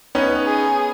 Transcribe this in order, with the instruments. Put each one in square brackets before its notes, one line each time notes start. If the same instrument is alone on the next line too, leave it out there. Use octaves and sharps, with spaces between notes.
[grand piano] B3 C#4 D#4
[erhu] G#4